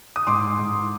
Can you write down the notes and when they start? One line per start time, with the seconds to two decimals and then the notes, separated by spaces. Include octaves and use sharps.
0.16 D#6
0.27 G#2 C6 D6
0.59 G#2